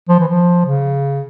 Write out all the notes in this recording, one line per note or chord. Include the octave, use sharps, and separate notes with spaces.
F3
E3
F3
C#3